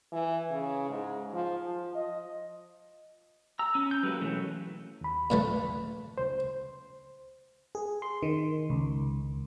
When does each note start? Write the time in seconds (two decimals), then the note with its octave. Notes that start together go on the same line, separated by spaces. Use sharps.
0.12 E3
0.51 C#3
0.90 G#2
1.33 F3
1.65 F3
1.95 D#5
3.59 A#5 E6
3.75 C#4
3.91 G6
4.03 F#3 G#3 A#3 B4
4.21 B1 E3 A3 C#4
5.01 D#2 B5
5.30 A#2 E3 A3
6.18 C#2 C5
7.75 G#4
8.02 C6
8.23 D#3
8.70 C#2